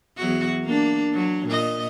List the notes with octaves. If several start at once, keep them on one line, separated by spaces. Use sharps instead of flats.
E2 F#3 F#4
A#3 D4
F#3
A#2 D#5